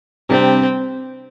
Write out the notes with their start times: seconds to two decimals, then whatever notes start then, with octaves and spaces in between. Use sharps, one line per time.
0.29 C3 G3 C4 D4 G4